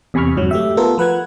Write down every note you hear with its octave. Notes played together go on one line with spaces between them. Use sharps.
E2 C3 G#5 B5 C#6 F6
F2 G#2 D3 F#3
A3 G4 E5
B3 F4 A4 A#4
F3 B4 F#5 F#6 G#6